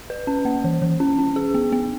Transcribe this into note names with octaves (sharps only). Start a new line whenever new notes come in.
B4
C#4
A#3
E3
E3
C#4
C#4
G#4
B3
B3